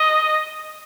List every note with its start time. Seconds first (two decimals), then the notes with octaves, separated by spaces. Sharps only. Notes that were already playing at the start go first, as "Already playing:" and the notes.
Already playing: D#5